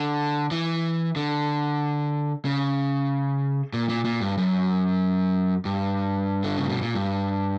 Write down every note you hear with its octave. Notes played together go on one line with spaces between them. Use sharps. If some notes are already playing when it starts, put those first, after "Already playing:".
Already playing: D3
E3
D3
C#3
A#2
A#2
A#2
G2
F#2
G2
D3
C#3
B2
A#2
G2